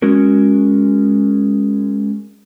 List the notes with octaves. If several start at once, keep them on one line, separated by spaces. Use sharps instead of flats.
G#3 C#4 F#4 A#4